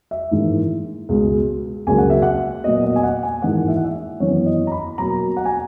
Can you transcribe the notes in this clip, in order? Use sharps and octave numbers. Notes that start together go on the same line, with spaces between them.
E5
G#2 E3 A#3
C#2 B2 G#3
C#2 C#3 F#3 A#3 G#5
F#5
E5
F#5
A#2 F#3 B3 D#5
D#5
G#5
F#5
G#5
G#2 E3 A#3 F#5
E5
F#5
E5
F#2 E3 B3 C#5
D#5
A#5
B5
B2 F#3 A#3 A#5
F#5
G#5